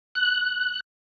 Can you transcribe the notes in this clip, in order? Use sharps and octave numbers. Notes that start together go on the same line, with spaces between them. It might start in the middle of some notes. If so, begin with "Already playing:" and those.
F#6